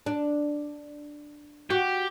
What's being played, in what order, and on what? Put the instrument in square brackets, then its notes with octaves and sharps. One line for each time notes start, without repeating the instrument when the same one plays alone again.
[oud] D4
[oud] F#4 [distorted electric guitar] G4